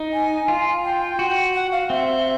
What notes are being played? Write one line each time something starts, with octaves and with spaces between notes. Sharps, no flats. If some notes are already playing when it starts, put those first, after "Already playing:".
Already playing: D#4
G#5
F4
G5
F#4
F#5
F5
C4 E5